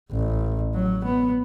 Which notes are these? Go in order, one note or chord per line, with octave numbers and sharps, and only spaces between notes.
A1
F#3
B3